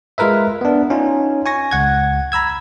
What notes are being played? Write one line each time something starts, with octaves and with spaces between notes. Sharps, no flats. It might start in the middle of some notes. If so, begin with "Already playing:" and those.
G#3 F4 A#4 B4 E5
B3 D4
C#4 D#4 F4
G#5 C#6 A#6
C#2 F#5 G#6
A#5 B5 E6 G#6